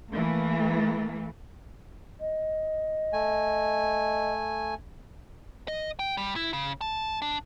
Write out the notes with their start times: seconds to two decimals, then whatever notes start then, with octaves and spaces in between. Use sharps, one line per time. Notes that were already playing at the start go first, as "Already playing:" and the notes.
0.13 E3 A3 A#3
2.18 D#5
3.13 A3 G#5
5.68 D#5
5.99 G5
6.17 G3
6.36 E4
6.53 C#3
6.81 A5
7.22 D4